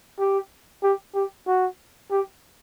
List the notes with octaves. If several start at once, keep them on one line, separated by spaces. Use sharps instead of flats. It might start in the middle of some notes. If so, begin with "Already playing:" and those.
G4
G4
G4
F#4
G4